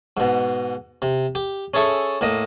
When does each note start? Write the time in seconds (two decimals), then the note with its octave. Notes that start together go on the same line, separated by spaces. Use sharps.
0.17 G#2 B2
1.02 C3
1.35 G4
1.74 C#4 G#4 A4 E5 C#6
2.21 A2 A#3 D#5